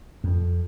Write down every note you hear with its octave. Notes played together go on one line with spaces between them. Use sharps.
F2